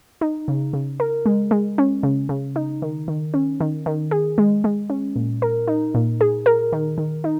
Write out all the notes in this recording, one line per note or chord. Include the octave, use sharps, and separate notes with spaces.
D#4
C#3
C#3
A#4
G#3
G#3
C#4
C#3
C#3
D#4
D#3
D#3
C#4
D#3
D#3
G#4
G#3
G#3
C#4
A#2
A#4
D#4
A#2
G#4
A#4
D#3
D#3
D#4